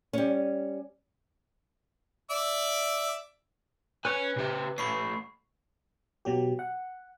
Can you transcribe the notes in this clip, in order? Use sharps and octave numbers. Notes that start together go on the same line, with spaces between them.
G3 C#4
D5 E5 D6
B4 C#5 G#5 F#6
C#3 G4
A3 C#4 B5 C#6 C7
B2 F#3 G4
F#5